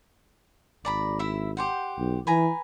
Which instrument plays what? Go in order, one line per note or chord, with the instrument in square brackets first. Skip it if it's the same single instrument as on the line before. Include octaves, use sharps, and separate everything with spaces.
[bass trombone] G#1 [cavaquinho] D5 A#5 B5
[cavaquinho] E4 E5
G4 C5 F#5
[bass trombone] B1
[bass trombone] E3 [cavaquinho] B4 G#5 A#5